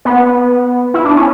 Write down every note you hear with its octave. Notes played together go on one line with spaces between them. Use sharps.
B3
E4
D4
C#4